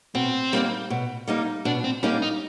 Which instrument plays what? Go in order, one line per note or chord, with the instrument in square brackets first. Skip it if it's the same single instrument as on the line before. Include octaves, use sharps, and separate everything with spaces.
[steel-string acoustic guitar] B2 [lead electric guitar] C4
[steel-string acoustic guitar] G3 A#3 D#4
B2
G3 A#3 D#4
[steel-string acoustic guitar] B2 [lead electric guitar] D4
[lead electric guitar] C4
[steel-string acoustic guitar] G3 A#3 D#4 [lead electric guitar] C#4
[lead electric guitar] D#4